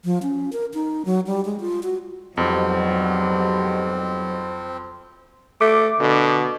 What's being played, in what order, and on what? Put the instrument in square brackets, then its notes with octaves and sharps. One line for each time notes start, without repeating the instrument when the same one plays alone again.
[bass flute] F3
C#4
A#4
D#4
F#3
G3
G#3
F4
F#4
[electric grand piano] F2 [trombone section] G#2 B2 G3 [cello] F#3 [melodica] C4
[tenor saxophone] A3 [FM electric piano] D6
[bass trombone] B2 [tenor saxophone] D3